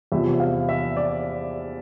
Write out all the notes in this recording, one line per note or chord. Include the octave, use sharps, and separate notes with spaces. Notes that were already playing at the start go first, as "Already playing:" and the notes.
E2 C3 F3 E5
F5
E5
D5